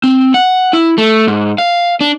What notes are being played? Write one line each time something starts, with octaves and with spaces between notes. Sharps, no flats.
C4
F#5
E4
A3
G#2
F5
D4